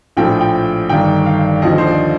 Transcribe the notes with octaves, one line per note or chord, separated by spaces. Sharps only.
A#1 A2 F3 G5
G5
G1 G2 D#3 G5
F5
D#2 D3 F3 D#5
C5
D5